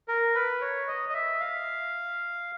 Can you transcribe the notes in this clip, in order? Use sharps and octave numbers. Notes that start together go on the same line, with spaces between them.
A#4
B4
C#5
D#5
D#5
E5
F5